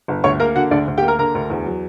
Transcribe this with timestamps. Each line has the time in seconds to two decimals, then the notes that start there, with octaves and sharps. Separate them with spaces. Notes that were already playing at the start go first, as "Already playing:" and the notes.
0.08 G1
0.24 D2 C#5 C#6
0.40 A#3 A#4 A#5
0.56 D3 F#4 F#5
0.71 D2 D4 D5
0.88 D2
0.98 G4 G5
1.03 A#3
1.08 A#4 A#5
1.19 D3 A#4 A#5
1.35 D2
1.50 E2
1.66 F#3